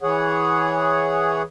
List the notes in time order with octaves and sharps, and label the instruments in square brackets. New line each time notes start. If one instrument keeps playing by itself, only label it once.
[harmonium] E3 G#4 C#5 F#5